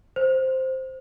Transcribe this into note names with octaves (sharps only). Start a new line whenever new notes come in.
C5